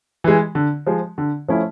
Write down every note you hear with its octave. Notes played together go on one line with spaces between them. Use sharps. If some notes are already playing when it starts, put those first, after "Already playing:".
E3 G#3
D3
F3 G#3
D3
F3 A3 C#4 E4